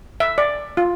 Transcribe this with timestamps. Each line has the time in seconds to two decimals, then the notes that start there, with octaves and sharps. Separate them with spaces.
0.20 E5
0.38 D5
0.77 F4